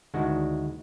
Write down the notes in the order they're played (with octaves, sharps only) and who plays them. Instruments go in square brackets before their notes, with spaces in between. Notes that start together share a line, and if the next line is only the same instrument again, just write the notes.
[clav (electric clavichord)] D2 D#3 G#3 D4 E4 F#4